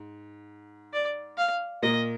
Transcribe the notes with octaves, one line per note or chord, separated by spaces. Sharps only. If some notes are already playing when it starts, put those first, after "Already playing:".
Already playing: G#2
D5
F5
A#2 A#3 D#5